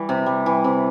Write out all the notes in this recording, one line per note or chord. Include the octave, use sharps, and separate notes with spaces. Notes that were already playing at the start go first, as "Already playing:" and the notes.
Already playing: E3 G3
C3
G3
E3
C3